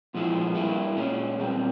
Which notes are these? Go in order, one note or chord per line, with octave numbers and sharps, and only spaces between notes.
A#2 F3 G#3 E4
G2 G3 A#3 E4
A#2 G#3 C#4
A#2 G3 C4